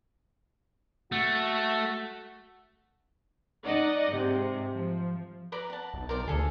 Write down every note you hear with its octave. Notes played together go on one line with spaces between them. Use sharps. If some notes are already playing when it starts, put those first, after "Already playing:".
A3 F#4
D#4 D5 D#5 F#5
G#2 C3
F3
B4 D5 A#5
F#5 A5
B1
A#4 C5 D5
D2 G#4 A4